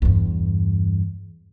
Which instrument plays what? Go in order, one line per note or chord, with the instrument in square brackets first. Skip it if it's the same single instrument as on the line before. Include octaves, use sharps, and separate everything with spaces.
[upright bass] E2 G2